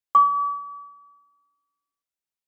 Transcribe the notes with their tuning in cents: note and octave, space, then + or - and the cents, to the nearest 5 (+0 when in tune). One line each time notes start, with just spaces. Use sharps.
D6 -45